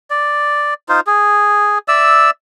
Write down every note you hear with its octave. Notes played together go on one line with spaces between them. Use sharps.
D5
D#4 F4 C5
G#4
D5 E5 E6